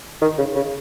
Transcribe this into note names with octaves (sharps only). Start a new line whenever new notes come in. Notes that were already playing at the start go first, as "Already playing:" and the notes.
D#3
C#3
C#3